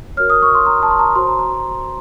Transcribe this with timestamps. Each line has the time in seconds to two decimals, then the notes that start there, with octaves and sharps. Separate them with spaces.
0.17 F#4 A#4 C#5 F6
0.30 D#6
0.42 C#6
0.55 C6
0.66 A#5
0.83 A5
0.91 C6
0.99 A#5
1.15 F#4 C5 C6
1.28 A#5
1.39 A#5